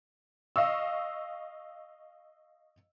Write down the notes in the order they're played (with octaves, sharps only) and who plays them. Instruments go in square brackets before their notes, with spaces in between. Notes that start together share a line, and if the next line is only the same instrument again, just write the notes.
[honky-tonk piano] D#5 F5 C#6 E6